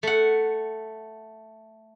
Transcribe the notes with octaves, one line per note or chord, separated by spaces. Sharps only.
A3 F#5